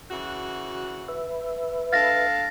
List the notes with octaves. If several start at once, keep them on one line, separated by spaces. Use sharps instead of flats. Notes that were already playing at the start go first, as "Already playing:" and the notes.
C#3 E3 F#4
B4 E5
D4 A4 F5 A6 A#6